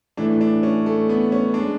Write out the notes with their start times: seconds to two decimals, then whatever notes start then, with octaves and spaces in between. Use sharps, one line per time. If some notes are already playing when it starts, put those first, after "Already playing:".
0.17 A2 E3 A3 D4
0.41 D4
0.63 C#4
0.86 A3
1.09 B3
1.32 C#4
1.54 G#3 D4